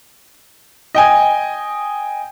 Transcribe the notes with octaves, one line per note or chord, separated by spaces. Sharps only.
D#5 G5 G#5